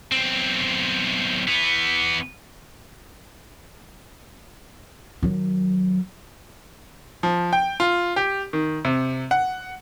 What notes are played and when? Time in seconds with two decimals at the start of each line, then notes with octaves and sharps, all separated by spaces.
0.12 B1 C4
1.48 E3 B3
5.23 D#3 F#3
7.23 F3
7.53 G5
7.80 F4
8.16 G4
8.53 D#3
8.85 C3
9.31 F#5